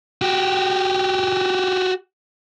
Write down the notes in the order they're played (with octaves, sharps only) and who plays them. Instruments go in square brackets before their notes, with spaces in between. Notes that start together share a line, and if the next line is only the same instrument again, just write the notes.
[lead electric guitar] F#4 G4